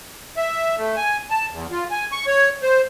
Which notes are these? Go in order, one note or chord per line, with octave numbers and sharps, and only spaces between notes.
E5
A3
G#5
A5
E2
F4
G#5
C#6
C#5
C5